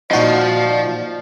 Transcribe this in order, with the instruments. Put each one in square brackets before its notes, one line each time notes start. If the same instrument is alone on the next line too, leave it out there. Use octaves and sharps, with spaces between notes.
[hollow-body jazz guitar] A#2 F4 D#5 [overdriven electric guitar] F3 C5 [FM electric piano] D#4 F#4 [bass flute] D5